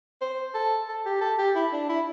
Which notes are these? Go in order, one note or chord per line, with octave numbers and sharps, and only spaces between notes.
C5
A4
A4
G4
A4
G4
E4
D4
E4